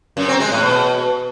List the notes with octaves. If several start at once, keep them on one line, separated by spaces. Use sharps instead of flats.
F#2
C4
G#3
A2
B2